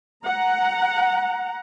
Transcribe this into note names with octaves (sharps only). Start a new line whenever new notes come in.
F#5 A#5